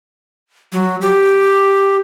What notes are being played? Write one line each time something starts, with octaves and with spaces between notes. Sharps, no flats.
F#3
G4